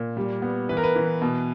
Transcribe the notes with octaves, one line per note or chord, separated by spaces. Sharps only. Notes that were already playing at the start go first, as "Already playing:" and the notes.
Already playing: A#2
G3
B3
E3 B4
A#4
B4
E3
B2